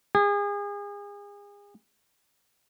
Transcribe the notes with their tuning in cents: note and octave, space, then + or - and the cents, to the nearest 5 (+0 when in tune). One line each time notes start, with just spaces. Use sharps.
G#4 -35